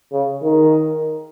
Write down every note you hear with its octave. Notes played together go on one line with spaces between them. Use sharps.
C#3
D#3